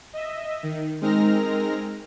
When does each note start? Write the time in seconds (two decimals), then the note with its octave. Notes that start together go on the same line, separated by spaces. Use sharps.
0.13 D#5 E5
0.63 D#3
1.01 G#3 C4 D#4 A#4 F6 A#6